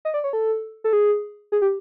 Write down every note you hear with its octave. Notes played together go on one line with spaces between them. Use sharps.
D#5
D5
C#5
A4
A4
G#4
G#4
G4